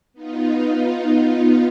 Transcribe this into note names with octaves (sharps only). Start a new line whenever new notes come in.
B3 D#4 F4